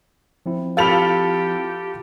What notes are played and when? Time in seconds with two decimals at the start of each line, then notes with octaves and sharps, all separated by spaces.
0.46 F3 C4 E4
0.77 F4 G4 A4 F5 B5 F7